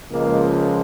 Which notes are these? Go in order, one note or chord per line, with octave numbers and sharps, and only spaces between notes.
C#2 C#3 F3 G#3 A#3